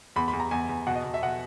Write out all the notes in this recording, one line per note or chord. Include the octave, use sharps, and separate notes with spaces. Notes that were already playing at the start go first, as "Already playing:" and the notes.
E2 B5
B5
E2
A#5
E2 G#5
E2
B2 F#5
D#5
B2
E5
B2 F#5